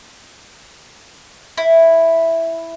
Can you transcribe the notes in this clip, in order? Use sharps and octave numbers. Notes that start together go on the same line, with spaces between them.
E4